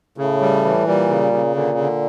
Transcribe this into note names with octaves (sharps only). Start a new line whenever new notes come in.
A2 C#3
G3
E3
A#2 G3
C#3
C#3
A#2 D3
D3